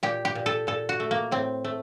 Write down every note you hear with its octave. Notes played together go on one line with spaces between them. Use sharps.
A#2 G4
G4
A#2
A4
A#2 A4
F#4
A3
A#3
A2 C4
A3